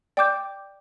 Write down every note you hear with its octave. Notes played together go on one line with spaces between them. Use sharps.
D5 G5 D6 G6